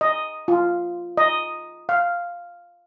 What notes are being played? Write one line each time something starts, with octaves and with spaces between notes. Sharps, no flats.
D#5
F4
D#5
F5